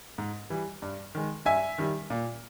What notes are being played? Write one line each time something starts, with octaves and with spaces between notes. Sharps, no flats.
G#2
E3 G3
G2
D#3 G#3
G2 E5 G#5
D#3 G3
A#2